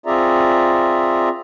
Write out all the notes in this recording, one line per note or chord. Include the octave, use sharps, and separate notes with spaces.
C4 F4 G#4 D5 E5 A#5